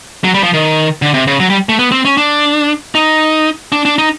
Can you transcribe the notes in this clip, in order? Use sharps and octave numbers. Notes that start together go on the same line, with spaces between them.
F#3
G3
F3
D#3
D3
C3
C#3
F#3
G3
A3
B3
C4
C#4
D4
D#4
D4
D4
D#4